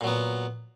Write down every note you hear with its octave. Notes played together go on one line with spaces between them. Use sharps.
A#2 F#3 B3